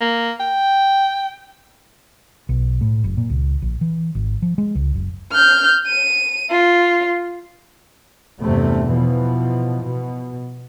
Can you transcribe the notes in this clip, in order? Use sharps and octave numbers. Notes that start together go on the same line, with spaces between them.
A#3
G5
B1
A2
F#1
A#2
C#2
A#1
E3
G#1
F3
G#3
C#2
F#1
F6 G6
D#7
F4
E2 G2 C3 A3
B2 E3 F3
B2